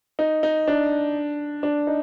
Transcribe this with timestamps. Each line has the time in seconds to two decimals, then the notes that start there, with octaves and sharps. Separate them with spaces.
0.19 D#4
0.43 D#4
0.68 D4
1.63 D4
1.87 D#4